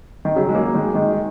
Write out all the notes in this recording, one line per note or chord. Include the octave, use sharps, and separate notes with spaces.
D#3
C#3 F#3
G#3
F#3 A#3
D#3 G#3
D#3 G#3